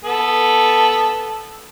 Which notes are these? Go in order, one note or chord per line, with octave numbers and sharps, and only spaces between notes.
B3 A4